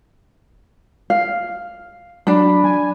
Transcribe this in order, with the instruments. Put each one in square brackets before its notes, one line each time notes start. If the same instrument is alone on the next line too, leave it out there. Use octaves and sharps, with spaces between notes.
[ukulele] F5
[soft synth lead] F#3 [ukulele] D4 B5
[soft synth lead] G#5